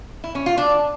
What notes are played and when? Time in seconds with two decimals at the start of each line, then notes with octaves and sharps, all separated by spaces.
0.24 E4
0.35 C#4
0.46 F4
0.58 D4